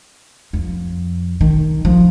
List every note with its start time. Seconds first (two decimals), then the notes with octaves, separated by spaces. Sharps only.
0.53 F2
1.41 D#3
1.85 F3